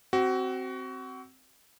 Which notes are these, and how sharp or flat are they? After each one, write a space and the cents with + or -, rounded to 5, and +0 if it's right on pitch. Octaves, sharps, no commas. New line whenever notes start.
C4 +0 F#4 +25